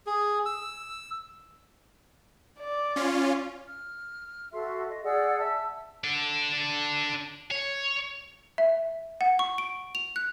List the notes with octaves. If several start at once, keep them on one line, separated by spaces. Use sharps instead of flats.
G#4
E6
D5
C#4 F4
F6
F#4 A4 E5 C6
D#5
G#4 D5 F#5 E6
E5 A5 E6
D4 A4
C#5
E5
F#5
C#6
D7
F7
F#6